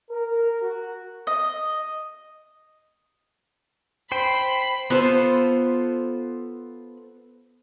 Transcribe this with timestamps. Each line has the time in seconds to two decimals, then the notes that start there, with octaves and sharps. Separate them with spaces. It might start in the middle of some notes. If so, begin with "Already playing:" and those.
0.11 A#4
0.63 F#4
1.27 D#5
4.12 C5 G5 B5
4.90 B3 F4 A4 C5